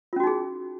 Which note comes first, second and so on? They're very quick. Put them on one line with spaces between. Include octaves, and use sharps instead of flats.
F4 C#4 F#4 D#4 G#4